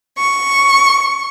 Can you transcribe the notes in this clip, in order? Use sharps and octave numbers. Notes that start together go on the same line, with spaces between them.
C#6